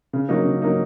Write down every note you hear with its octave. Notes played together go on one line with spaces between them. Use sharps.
C#3
F#3 A#3 D#4
C#3
F#3 A#3 D#4